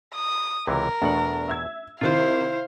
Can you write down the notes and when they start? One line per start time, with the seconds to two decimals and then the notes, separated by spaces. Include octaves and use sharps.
0.14 D#6
0.67 C#2 C3 E3 A#4
1.02 E2 B2 A3 D4 F#5
1.48 E5 E6 G#6
2.01 C3 D#3 E4 F4 C5 F5